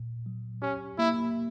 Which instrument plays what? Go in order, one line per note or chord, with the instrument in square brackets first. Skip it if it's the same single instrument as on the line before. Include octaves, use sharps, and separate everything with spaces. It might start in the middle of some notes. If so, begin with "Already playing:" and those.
Already playing: [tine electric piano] A#2
F#3
[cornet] C#4 [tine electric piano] G4
[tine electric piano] A#3 [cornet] E4